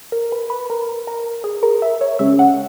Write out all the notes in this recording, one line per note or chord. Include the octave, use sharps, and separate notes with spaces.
A#4
B4
B4
A#4
A#4
G#4
A#4
E5
C#5
C#3 G#3 C#4 E5
F#5